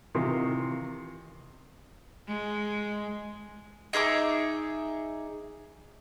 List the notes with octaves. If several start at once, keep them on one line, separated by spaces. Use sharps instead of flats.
C3 D#3 E3 F4
G#3
D#4 G#4 E5 D6